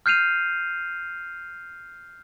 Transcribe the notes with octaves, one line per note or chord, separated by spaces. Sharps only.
F6 G6 C7 D#7 F7